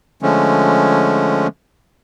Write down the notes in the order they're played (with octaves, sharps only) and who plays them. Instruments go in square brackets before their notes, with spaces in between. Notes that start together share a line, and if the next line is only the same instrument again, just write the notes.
[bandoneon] D3 F3 G#3 A3 C#4